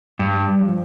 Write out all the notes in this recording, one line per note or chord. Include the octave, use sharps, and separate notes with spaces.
G2 G3
F3